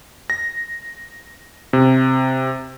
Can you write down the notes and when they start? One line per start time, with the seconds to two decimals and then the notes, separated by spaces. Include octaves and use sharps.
0.30 A#6
1.73 C3